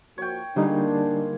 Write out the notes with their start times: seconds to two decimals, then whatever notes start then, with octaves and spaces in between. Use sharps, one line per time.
0.18 F3 A#3 F#4 C#5 G5
0.56 A#2 D3 G3 G#3 D4 D#4